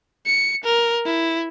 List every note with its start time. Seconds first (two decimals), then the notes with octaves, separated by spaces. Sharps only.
0.26 C#7
0.64 A#4
1.06 E4